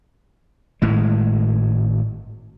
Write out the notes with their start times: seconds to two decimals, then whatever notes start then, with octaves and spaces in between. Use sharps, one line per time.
0.82 G#1 A2 G#3